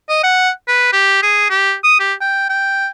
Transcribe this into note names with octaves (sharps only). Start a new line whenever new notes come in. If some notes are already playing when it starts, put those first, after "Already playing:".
D#5
F#5
B4
G4
G#4
G4
D#6
G4
G5
G5